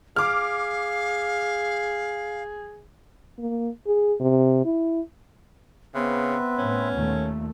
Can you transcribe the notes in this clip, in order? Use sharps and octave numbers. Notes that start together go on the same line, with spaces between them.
G#4 F5 D6 F6
A#3
G#4
C3
E4
C#3 B3 C4 B4 E5
A2 C#4
D#2 A#2 A3